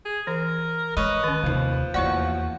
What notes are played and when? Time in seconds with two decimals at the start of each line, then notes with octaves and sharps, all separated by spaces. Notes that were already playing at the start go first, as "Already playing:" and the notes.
0.05 G#4
0.27 E3 A#4
0.97 G#3 B4 C#5 D#5
1.24 D#3 C#4
1.43 D#2 C3 F3
1.94 E2 A#3 F#4 C#5 D5 C#6